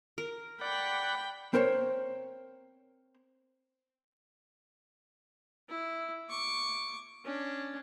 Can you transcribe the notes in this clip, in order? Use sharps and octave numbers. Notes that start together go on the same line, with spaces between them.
A#4
D5 F#5 G5 B5
C4 A#4 C5 C#5
E4
C#6 D6
C#4 D4